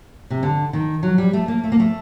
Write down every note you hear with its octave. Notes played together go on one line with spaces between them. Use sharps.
C3
D3
D#3
F#3
G3
A3
A#3
A3
A#3
A3